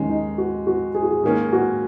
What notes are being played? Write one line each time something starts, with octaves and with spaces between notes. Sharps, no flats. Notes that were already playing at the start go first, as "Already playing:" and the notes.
Already playing: D#2 D#3 G#3 C#4
D#4
F#4
F#4
G#4
F#4
G#4
G#2 D#3 A#3 C#4 G#4
F#4